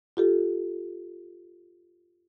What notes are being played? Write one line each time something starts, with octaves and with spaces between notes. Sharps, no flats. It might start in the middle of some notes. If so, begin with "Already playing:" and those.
F4 G4 A4